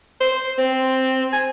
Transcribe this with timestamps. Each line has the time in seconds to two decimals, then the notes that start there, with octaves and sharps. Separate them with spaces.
0.21 C5
0.58 C4
1.33 G#5